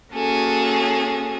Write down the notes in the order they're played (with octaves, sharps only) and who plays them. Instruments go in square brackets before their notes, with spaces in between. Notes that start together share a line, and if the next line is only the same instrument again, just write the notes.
[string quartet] A#3 C#4 F#4 G#4 A4